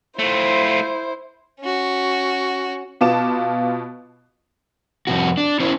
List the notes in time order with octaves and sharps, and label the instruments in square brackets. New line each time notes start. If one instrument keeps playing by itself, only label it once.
[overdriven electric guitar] A3 F4 [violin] E4 C5
[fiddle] C#4 F#4
[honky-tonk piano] B2 B3 F4 A5 D6 E7
[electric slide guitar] F2 C3 F#4
D4
C#4 E4 C5